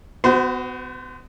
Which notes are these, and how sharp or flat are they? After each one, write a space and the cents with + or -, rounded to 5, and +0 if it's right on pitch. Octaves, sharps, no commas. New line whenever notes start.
B3 +30 F#4 +0 C5 -25